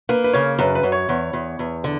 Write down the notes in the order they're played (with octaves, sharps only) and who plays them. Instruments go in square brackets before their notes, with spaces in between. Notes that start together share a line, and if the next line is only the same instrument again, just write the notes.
[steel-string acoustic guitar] A#3 [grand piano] B4
[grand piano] B4
[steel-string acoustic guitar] C#3 [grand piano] C#5
[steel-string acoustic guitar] F#2 [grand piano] B4
[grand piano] B4
[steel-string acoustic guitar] F#2
[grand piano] C#5
[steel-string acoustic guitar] E2
E2
E2
D3